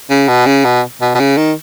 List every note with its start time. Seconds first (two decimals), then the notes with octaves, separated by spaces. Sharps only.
0.10 C#3
0.28 B2
0.46 C#3
0.64 B2
1.01 B2
1.15 B2
1.20 C#3
1.38 D#3